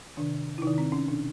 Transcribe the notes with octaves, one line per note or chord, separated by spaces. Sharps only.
C3 D#3 D4
E4
C3 D#3 D#4
C4
C#4
B2 D4